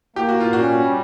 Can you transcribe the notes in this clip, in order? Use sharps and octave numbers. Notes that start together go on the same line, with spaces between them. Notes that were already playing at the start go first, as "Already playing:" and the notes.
A#3 G4
F#4
A#2 F4
C#4 F#4
G3